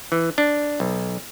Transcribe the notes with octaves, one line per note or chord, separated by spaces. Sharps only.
E3
D4
B1